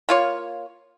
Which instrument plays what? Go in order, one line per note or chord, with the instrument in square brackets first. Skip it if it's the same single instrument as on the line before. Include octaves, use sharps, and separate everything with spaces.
[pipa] A#3 F4 C#5